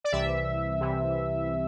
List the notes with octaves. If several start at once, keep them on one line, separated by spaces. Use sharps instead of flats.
D5
C2 C3 E3 E5
C2 C3 E3